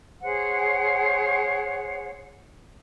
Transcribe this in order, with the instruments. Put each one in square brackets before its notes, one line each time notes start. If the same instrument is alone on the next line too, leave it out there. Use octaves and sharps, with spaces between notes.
[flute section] G#4 C5 C#5 F#5